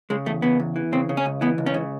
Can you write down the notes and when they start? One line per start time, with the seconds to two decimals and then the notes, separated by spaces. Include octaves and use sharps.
0.10 C#3 G#3
0.26 E2 A3
0.42 C#3 B3
0.60 E2
0.76 E3
0.92 C#3 C4
1.09 C#3
1.17 C#4
1.26 C#2
1.41 E3 B3
1.58 C#2
1.66 C#4
1.74 C#3